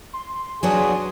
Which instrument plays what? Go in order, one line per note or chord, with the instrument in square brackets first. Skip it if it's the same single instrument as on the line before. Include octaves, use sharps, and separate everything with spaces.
[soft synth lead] C6
C6
[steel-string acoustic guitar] F#3 B3 D4 [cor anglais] G#4